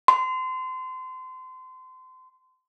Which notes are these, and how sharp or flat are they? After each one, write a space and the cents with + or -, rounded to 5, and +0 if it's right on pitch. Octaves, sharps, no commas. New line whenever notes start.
C6 -30